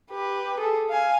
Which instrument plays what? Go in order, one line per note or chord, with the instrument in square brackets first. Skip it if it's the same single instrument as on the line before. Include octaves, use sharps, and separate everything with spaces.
[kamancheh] G4 B4
G#4 A4
F5 G#5